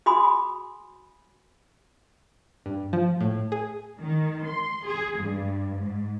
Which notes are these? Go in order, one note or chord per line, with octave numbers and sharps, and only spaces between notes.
F#4 G#4 G#5 B5 C6 D#6
G2
F3
A2
G#4
D#3
C6
G#4
G2
G#2